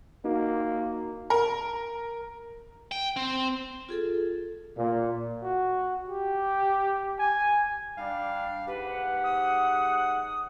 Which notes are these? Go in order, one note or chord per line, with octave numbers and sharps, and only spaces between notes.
A#3 D#4 F#4
A#4
G5
C4
F4 G#4 A4
A#2
F#4
G4
G#5
G3 D4 F5
G#2 G4 B4 F#5
D#6